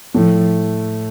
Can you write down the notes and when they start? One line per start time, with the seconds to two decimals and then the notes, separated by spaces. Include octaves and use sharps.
0.14 A2 F3 A3